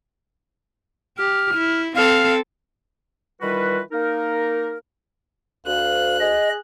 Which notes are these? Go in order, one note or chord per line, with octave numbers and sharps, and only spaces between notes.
G4 F6
E4
C4 A4 F5
D#3 E3 G3 F4 F#4 B4
A#3 D#4 A#4
D2 F5 F#6
G#4 D#5